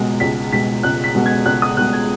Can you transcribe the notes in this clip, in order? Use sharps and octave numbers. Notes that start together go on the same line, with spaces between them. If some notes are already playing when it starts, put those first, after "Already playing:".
Already playing: C#2 B2 G#3
C#2 B6
B2 G#3 B6
C#2 F#6
B6
B2 G#3
G#6
C#2 F#6
D#6
B2 G#3 F#6
G#6